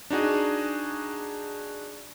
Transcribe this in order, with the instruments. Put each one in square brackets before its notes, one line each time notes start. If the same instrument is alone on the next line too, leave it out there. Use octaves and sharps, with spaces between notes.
[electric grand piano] D4 D#4 F#4 G#4